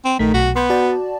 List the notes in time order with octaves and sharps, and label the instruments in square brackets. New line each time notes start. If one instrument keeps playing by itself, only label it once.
[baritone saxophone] C4
[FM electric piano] A#1 A3 B6 [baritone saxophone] D#3
[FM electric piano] B1 [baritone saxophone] F#4
[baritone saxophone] B3 [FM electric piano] C6 F#6 G6
[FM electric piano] F#4 D5 A5